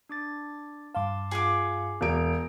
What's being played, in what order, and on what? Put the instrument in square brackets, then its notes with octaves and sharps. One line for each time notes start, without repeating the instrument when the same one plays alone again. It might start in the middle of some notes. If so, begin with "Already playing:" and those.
[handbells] D4 D6 A6
[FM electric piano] G2 F5 [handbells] A5 C6 D6
[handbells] F4 F#5 C6 [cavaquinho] G#4 G#5 D6
[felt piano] E1 D7 [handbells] A#5 G6